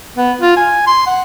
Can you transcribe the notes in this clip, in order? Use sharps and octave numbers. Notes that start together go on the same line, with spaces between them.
B3
F4
G#5
C6
F#5